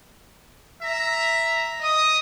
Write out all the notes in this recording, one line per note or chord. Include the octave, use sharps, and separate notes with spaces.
E5 A#5
D#5 D#6